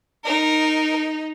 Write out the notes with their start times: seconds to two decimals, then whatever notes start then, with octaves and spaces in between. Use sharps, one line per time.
0.24 D#4 A#4